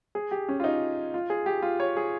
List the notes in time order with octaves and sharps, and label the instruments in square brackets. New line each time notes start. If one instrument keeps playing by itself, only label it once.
[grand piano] G#4
G4
C#4
F4
D#4
F4
G#4
G4
F4
C#5
G#4